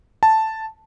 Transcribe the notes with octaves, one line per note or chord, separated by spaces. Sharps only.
A5